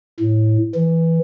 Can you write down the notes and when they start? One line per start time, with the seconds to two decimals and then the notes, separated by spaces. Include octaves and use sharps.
0.20 A2
0.75 E3